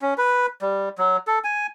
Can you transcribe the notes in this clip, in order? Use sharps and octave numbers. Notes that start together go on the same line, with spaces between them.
C#4
B4
G3
F#3
A4
G#5